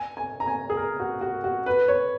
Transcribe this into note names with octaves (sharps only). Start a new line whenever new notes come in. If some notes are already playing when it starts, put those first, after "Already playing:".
Already playing: G#5
G#5
A#5
G#5
G#4
A#4
F#4
F#4
F#4
B4
C#5